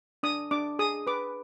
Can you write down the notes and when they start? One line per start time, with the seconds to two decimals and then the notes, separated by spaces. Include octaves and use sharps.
0.23 D4 D#6
0.51 D4 D6
0.79 G#4 D#6
1.07 B4 D6